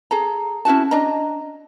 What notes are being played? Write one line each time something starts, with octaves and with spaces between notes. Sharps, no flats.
G#4 A4 A#5
C#4 E4 F#4 A5
D4 D#5 A#5